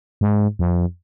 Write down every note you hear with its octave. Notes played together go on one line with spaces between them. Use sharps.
G#2
F2